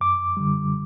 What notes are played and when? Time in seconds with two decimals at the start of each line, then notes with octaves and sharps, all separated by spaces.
0.01 F#2 D6
0.37 D3 G3